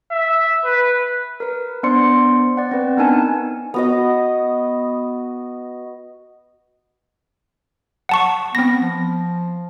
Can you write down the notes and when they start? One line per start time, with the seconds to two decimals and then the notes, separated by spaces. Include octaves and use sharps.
0.11 E5
0.65 B4
1.40 A#4 B4
1.83 B3 D4 C5 D5 C6 C#7
2.57 D5 F#5
2.71 C4 B4
2.97 B3 D4 D#4 A#4 G#5 A5
3.74 B3 F#4 D#5
8.09 F#5 A5 C#6
8.55 B3 C4 A#6
8.83 F3